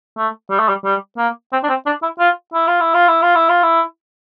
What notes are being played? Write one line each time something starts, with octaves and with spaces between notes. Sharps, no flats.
A3
G3
A3
G3
G3
A#3
C4
D4
C4
D4
E4
F4
E4
F4
E4
F4
E4
F4
E4
F4
E4